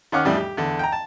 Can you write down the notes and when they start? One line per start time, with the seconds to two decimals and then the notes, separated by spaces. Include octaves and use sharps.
0.12 D#3 C#4 F#5 D6 F6
0.25 F2 A2 E3 G3 D4
0.37 G4
0.57 E2 D3
0.79 G5 A#5
0.92 A5